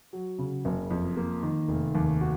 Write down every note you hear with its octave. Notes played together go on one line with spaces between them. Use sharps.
F#3
C#3
F#1
F2
A#3
D#3
F1
D#2
F#4